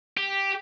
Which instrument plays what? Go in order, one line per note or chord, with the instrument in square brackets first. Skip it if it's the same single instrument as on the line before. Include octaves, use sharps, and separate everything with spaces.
[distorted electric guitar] G4